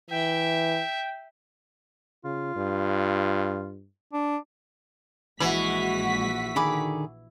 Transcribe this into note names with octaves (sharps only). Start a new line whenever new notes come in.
E3 E5 G5
C#3 F4
G2
D4
A#1 E3 G#3 F#4 B5 B6
D3 D#3 G#4 B5 D6